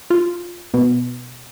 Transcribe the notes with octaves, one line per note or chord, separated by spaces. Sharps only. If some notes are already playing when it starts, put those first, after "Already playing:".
F4
B2